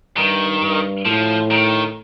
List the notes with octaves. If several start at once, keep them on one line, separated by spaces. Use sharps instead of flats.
G2 D#3
G2
A2 F3
D#3